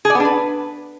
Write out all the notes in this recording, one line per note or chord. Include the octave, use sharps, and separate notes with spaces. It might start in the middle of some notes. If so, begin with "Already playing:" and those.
G#4
D5
B3
D4
B4